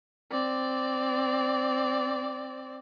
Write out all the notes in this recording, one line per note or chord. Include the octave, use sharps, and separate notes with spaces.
C4 D5